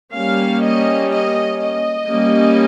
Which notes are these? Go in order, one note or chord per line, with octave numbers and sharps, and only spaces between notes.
G3 A#3 C#4 F5
D#5
D#5
D#5
G3 A#3 C#4